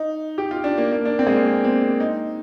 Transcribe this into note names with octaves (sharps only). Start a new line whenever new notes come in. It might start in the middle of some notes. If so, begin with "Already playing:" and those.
Already playing: D#4
G4
F4
D4
A#3
A#3
D4
C4
G#3
A#3
A#3
C4
D#4